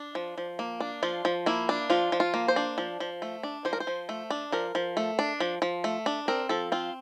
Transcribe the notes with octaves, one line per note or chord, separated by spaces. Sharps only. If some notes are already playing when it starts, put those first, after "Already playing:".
Already playing: D4
F3
F3
A#3
D4
F3 F4
F3
A#3 E4
D4
F3 F4
F3
F4
A#3
C5
D4
F3
F3
A3
D4
F3 C5
A#4
C5
F3
A3
D4
F3 A#4
F3
A3
D4
F3
F3
A3
D4
C4 A#4
F3 A4
C4 F4